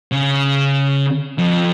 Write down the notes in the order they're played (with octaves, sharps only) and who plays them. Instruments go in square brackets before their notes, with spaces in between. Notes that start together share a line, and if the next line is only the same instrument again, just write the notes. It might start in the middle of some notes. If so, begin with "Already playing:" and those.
[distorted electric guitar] C#3
F2